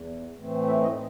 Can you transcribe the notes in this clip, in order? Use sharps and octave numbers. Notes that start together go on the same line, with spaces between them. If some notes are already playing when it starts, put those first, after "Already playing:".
Already playing: E2
A2 E3 A3 C4
E4 E5
D#4 D#5